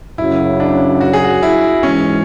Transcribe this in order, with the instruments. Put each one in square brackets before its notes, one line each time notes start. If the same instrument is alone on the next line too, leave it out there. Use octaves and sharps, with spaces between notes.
[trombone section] F#2 C#3 F#3 [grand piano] E4
[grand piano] D4
F#4
G#4
F#4
E4
[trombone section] G#2 E3 G#3 [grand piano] C#4